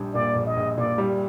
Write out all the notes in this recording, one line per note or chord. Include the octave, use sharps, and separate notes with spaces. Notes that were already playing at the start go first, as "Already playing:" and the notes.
Already playing: A#1 G3 D4
A#2 D5
A#1
D#5
A#1
A#2 D5
G3